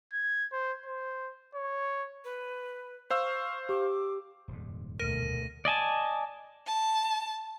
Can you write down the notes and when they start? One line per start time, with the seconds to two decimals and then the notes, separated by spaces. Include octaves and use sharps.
0.13 G#6
0.52 C5
0.86 C5
1.55 C#5
2.24 B4
3.10 C5 F5 C#6 E6
3.69 G4 D6
4.48 D#1 F2 G#2
5.00 D2 B2 A#4 A#6 D#7
5.65 D5 D#5 G#5 A5
6.67 A5